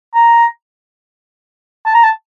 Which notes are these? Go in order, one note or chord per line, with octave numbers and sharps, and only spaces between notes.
A#5
A5
A#5
A5